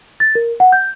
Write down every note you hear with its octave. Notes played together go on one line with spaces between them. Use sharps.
A6
A#4
F#5
G6